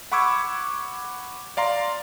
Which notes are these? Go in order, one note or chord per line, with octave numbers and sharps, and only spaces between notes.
F#5 B5 C#6 D6 E6 G#6
D5 F5 A#5 C6